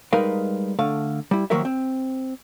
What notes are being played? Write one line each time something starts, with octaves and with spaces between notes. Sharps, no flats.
G3 G#3 D#4 A#4 B4 F5
D3 A3 F5
G3 E4
D#3 F3 F#3 A#3 A#4 E5
C4